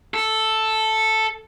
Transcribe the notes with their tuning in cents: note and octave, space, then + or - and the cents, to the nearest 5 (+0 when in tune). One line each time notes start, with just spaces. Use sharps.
A4 +0